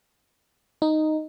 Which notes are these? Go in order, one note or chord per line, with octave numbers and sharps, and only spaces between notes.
D#4